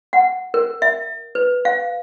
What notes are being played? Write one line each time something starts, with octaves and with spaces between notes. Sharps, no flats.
F#5
A#4
E5
B4
F5